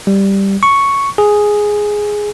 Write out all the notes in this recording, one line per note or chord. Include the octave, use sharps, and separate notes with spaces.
G3
C#6
G#4